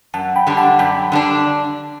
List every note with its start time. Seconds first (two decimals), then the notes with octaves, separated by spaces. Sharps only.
0.14 F#2 F#5 A5
0.36 G5 B5
0.47 D3 G3 D4
0.57 F#5 A5
0.79 F#2 G5 B5
1.12 D3 G3 D4